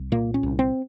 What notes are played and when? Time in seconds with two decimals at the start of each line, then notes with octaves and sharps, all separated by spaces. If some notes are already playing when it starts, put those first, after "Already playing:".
Already playing: C2
0.12 A#2 A#3
0.34 C#4
0.43 C2
0.59 C4